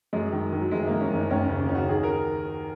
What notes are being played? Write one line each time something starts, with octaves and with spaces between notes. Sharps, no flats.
F#2 G#3
D#3
D#3
F#3
F#1 G#3
F#1 A#3
C#4
F#1
D#4
D#2 C#4
C#3 C#4
C#4
C#3 D#4
F#4
D#3 G#4
A#4